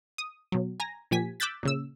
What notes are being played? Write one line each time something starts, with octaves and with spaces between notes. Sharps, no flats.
D#6
B2 F#3
G#5 A#5 A#6
A#2 F3 G4 G#5 B6
D6 E6 F#6 G6 A6 B6
A#2 C#3 E6